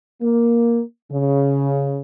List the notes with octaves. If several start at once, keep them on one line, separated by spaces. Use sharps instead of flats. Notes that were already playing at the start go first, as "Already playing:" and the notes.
A#3
C#3